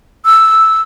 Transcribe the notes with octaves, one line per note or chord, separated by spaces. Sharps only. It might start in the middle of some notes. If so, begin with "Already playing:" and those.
E6